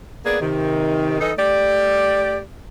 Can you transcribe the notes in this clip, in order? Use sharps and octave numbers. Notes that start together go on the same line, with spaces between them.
A#3 B3 G#4 D5
C3 D#3
E3 D#4 A4 B4 D#5
A3 G4 D5